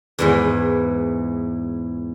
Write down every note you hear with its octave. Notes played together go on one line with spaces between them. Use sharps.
E2 G#2 E3